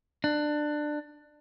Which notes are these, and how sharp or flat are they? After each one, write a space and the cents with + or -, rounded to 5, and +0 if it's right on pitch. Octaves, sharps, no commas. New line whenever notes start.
D4 +20